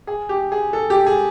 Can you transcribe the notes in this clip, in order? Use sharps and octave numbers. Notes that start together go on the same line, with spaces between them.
G#4
G4
G#4
A4
G4
G#4